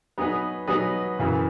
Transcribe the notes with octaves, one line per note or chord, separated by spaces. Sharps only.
F#3 B3 D#4 G#4 B4
F#3 B3 D#4 G#4 B4
F#2 C#3 E3